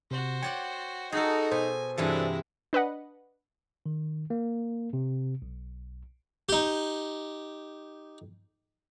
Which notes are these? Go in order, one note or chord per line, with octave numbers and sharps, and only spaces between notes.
C3 F#4 C5
C#5 D5 F#5 G5
D#4 F#4 G#4 A4
B2 C5 G#5
G2 C3 E3 F#3 G#3 D4 E4 A4
D4 B4 D#5 F#5
D#3
A#3
C3
B1
D#4 G4